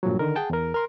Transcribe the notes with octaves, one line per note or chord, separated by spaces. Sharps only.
G2 A#2 F3 F#3
D3 D#3 A#4
G#4 F#5 G5 A5
E2 A#4
A#4 C6